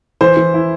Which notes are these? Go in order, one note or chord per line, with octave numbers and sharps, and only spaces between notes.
E3 C5
E3
E4